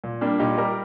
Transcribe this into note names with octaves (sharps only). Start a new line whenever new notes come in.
A#2
G3 A#3 D4
A#2 D#4 G4
G3 G4 A#4